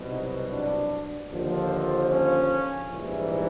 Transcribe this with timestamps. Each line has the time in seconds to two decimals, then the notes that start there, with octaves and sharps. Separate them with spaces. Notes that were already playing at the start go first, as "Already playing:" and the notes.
Already playing: C2 B2 F#3
0.11 D#4
0.51 D4
1.31 D#2 D3 F3
2.10 C#4
2.90 A#1 G#2 E3 G3